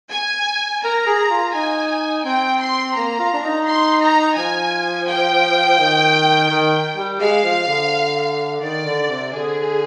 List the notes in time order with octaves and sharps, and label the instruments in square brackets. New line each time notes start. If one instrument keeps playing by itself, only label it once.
[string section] G#5
[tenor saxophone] A#4 [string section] A#5
[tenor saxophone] G#4
F4
[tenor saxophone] D#4 [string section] G#5
[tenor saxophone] C4 [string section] G5
[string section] C6
[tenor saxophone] A#3 [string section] A#5
[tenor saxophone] F4
D4
D#4
[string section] C6
A#5
[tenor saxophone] F3 [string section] G#5
[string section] G5
[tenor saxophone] D#3
D#3
G3
[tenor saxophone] G#3 [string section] F5
[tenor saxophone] F3
D3
[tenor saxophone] D#3 [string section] D5
[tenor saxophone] D3
C3
[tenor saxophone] D3 [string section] G#4